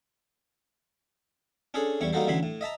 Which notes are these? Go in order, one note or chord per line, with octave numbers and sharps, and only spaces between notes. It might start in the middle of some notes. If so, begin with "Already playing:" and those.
C#4 D4 G#4 A4 D5
E2 G3 E4 C#6
G3 A#3 D#4 F#4 A4 C5
A1 D2 F#3 E4 B5 C6
A2
D#5 E5 A5 A#5